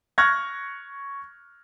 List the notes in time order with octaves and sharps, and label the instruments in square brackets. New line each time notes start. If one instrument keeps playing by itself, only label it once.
[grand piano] C#6 F6 F#6 G#6 A#6